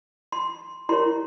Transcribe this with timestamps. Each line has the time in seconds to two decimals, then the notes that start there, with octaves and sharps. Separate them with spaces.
0.32 C6
0.89 E4 G4 A#4 C#5 C6